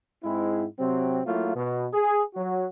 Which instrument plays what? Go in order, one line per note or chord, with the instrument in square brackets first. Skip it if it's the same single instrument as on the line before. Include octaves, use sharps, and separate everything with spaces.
[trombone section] G#2 G#3 C4 E4
C3 F#3 C4
F#3 A3 A#3 E4 F4
B2
G#4
F#3 F#4